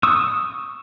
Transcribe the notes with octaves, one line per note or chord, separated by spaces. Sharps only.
C#6 D#6 E6